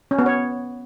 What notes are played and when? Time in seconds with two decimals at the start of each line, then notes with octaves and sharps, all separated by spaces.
0.11 C#4
0.19 B3
0.26 C#5